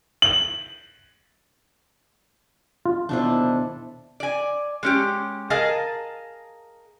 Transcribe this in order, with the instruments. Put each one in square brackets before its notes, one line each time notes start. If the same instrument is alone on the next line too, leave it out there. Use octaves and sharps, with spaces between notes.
[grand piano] F#7
[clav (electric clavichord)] F4
[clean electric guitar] D#2 B2 C5 [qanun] D4 E4 A4
[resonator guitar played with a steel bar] D5 G#5
G#3 C#4 G4
G#4 A#4 D#5 F5 G#5 A5